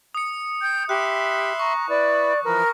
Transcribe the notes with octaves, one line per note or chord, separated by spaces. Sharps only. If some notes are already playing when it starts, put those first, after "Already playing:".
D#6 C#7
G5 G6
G4 E5 B5 C6 F#6
A#5 C#6
E4 B4 D5
E3 F3 A#4 B4